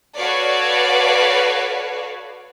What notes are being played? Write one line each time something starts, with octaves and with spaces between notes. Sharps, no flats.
F#4 A4 B4 C#5 D5 F5